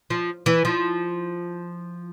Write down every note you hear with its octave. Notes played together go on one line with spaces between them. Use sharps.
F3
E3
F3